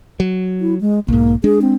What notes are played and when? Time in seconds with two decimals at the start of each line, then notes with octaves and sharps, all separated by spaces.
0.20 F#3
0.61 E4
0.81 G#3
1.08 B1 G#2 A#3
1.44 G#3 D4 G#4
1.62 C4